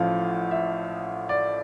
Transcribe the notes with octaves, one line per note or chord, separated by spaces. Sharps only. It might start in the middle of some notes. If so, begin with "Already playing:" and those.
Already playing: A1 A2 F3 F5
E5
D5